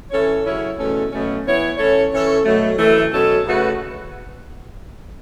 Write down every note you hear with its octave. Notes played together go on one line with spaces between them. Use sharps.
E3 C#4 A4 C#5
C#3 F#3 C#4 E4 C#5
E2 B2 A3 C#4 A4
B2 F#3 A3 C#4
E3 B3 E4 C#5
E3 C#4 A4 C#5
E3 C#4 A4 C#5
B2 F#3 A3
F#2 E3 A3
B2 F#3 C#4 A4 C#5
C#3 A3 F#4 B4